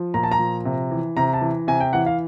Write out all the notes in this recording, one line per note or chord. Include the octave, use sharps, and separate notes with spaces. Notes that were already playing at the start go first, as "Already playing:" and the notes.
Already playing: F3
A#2 A#5
A5
A#5
F3
C3
E3
C3 A#5
A5
E3
C3 G#5
G5
E3 F#5
F5